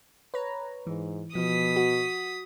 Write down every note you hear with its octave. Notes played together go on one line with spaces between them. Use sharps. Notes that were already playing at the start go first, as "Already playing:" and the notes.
B4 C#5 A#5
G#2 E3
B2 F3 D#6 B6
F#4